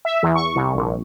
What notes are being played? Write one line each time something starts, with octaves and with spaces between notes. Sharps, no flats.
E5
E2
C#6
C2
A#1